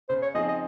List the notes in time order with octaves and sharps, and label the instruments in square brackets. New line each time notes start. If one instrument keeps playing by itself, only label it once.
[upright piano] C#3 [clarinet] C5
[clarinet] C#5
[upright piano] F3 C4 D#4 G#4 [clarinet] D#5
[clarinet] D#5